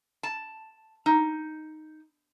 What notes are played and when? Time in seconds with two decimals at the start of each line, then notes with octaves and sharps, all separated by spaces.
0.23 A5
1.06 D#4